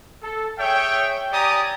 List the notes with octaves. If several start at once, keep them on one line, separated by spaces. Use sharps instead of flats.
A4
G#4 C#5 E5 G5
G4 D5 G#5 A#5 D#6